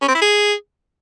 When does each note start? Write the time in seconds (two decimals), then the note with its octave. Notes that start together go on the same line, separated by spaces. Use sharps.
0.01 C#4
0.08 C4
0.15 E4
0.21 G#4